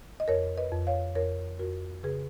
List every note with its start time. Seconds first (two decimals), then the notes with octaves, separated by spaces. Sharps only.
0.20 D#5
0.28 F2 A#4 C#5
0.57 B4 D#5
0.72 F2
0.87 C#5 F5
1.15 F2 A#4 C#5
1.59 F2 F#4 A#4
2.03 C#3 G#4 B4